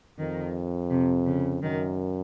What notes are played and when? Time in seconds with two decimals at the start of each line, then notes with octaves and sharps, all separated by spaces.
0.18 F2 D#3
0.90 C3
1.27 C#3
1.62 F#2 D#3